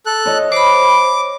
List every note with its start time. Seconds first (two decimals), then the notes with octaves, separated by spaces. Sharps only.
0.06 A4 F#6
0.26 C#5 D#5
0.52 C5 B5 D6